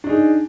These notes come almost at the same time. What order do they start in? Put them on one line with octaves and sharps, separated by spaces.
D4 D#4 G#4